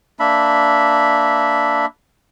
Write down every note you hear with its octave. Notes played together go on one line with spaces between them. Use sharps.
A#3 D4 E5 B5